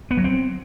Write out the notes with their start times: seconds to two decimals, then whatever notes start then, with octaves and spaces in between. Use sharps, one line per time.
0.11 B3
0.17 F#3
0.24 C4